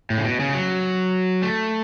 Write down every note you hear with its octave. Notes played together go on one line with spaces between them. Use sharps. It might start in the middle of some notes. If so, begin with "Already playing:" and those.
A2
C#3
B2
C#3
F#3
A3